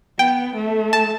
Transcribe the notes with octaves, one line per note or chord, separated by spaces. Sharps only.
B3 G5
A3
A5